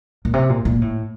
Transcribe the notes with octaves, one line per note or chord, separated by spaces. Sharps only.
A#2
C3
A#2
A#2
A2